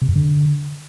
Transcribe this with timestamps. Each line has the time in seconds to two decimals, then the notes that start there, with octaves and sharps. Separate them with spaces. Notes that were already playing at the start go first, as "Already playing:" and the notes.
0.02 C3
0.09 F2
0.16 D3